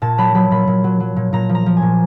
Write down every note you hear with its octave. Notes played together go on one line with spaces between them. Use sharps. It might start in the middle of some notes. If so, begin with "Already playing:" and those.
A#2 A5
F#3 B5
F#3 B5
A#2 B5
A#2
F#3
F#3
A#2
A#2 A#5
F3
A#5
F3
G#5
A#2